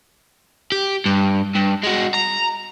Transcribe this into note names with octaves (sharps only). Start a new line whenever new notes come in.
G4
G2
G2
G#3 F#4
A#5